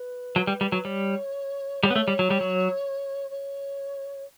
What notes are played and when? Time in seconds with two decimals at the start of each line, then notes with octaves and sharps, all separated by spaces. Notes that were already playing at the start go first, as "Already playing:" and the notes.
Already playing: B4
0.36 F#3
0.47 G3
0.61 G3
0.72 F#3
0.84 G3 C#5
1.83 G3 C#5
1.90 B3
1.96 A3
2.08 G3
2.19 F#3
2.30 G3
2.41 F#3
3.30 C#5